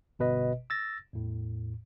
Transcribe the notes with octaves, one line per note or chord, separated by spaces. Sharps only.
G1 B2 B4 D#5
E6 A6 A#6
E2 A2